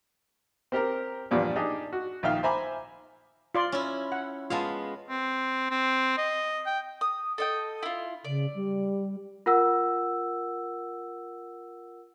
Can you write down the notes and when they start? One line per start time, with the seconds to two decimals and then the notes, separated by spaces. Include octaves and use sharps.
0.72 C4 G4 A#4 A#5
1.31 E2 G2 A#2 F3 G3
1.56 D4 D#4 G4 G#4
1.93 F#4
2.23 A#1 D#3 E5 F5 G5 F6
2.43 C5 E5 G#5 A#5 B5 D6
3.55 F4 D5 C6
3.72 C#4 E4
4.12 F#5
4.50 G#3 B3 F4 F5 A5
5.10 C4
5.71 C4
6.18 D#5
6.66 G5
7.01 D#6
7.38 A4 D#5 G5
7.83 E4 F4
8.25 C#3 D5
8.54 G3
9.46 F4 A#4 F#5 E6